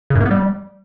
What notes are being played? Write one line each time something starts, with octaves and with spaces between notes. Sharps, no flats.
C#3
F#2
A#3
B3
G3